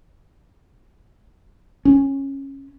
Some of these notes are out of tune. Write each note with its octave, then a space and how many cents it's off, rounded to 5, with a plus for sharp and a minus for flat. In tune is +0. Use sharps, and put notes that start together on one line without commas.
C#4 -15